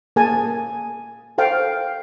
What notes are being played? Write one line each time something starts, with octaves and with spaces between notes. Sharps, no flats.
A#3 G#4 G#5 A5
A4 C5 F5 G5